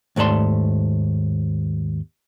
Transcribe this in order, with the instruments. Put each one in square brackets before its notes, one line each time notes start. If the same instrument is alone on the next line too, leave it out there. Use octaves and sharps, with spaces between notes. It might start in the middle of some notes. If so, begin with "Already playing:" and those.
[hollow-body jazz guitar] D#2 G#2 A3 D5 A5 C6